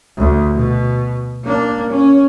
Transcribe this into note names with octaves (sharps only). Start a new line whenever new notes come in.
D2
B2
A#3 D4
C#4